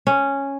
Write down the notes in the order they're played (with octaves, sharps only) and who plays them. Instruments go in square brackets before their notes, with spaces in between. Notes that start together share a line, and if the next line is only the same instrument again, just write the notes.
[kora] C#4